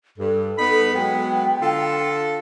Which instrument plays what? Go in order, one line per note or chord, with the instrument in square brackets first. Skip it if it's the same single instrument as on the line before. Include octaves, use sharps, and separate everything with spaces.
[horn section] G2 [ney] A4
[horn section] B3 D#4 B5
[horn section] F#3 G#3 B3 [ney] G5
[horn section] D3 F4 A4